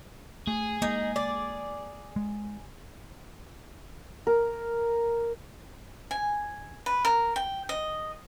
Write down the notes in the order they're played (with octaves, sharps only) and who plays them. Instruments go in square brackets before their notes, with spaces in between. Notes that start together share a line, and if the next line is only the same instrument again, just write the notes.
[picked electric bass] A3 [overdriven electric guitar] G#4
[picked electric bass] G#3 A#3 [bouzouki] D#4
[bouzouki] D5
[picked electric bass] G#3
[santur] A#4
[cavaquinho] G#5
B4
A#4
G5
D#5